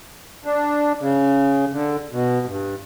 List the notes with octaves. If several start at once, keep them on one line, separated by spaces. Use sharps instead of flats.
D4
C#3
D3
B2
G2